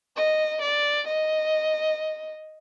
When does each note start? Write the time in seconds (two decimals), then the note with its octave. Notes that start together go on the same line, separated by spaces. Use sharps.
0.16 D#5
0.62 D5
1.07 D#5